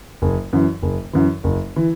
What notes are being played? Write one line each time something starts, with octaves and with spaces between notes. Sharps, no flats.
F#1
F#2 E3
F#1
F#2 E3
F#1
E3